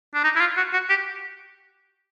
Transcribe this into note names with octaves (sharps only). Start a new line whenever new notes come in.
D4
D#4
E4
F4
F#4
F#4
G4